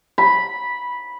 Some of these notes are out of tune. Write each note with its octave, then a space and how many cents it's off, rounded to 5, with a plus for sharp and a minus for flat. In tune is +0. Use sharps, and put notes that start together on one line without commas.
B5 -10